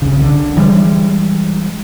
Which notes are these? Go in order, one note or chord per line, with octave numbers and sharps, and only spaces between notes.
C2 C#3
D3
E3 G3 G#3